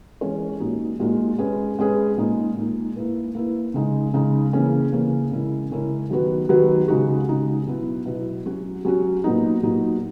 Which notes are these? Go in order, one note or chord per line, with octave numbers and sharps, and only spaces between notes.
E3 G#3 C#4 G#4 C#5
A#2 G#3 D#4 F#4
A#2 G#3 D#4 F#4
G#3 C#4 G#4 B4
G#3 C#4 G#4 B4
A#2 G#3 D#4
A#2 G#3 D#4
A#3 E4 B4
A#3 E4 B4
C#3 G#3 D#4
C#3 G#3 D#4
C#3 E3 A#3 C#4 G#4
C#3 E3 A#3 C#4 G#4
C#3 G#3 C#4 E4 A#4
C#3 G#3 C#4 E4 A#4
D#3 F#3 B3 F#4 B4
D#3 F#3 B3 F#4 B4
C#3 G#3 D#4 F#4
C#3 G#3 D#4 F#4
B2 F#3 B3 E4
B2 F#3 B3 E4
F#3 C#4 F#4
F#3 C#4 F#4
A#2 F#3 B3 D#4
A#2 F#3 B3 D#4